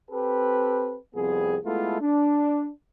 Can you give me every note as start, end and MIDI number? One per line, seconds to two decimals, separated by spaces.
0.11 0.97 60
0.11 0.97 67
0.11 0.97 69
0.11 0.97 71
1.15 1.57 36
1.15 1.57 41
1.15 1.57 59
1.15 1.57 60
1.15 1.57 68
1.65 1.99 56
1.65 1.99 57
1.65 1.99 59
1.65 1.99 64
1.65 1.99 65
1.65 1.99 69
2.01 2.69 62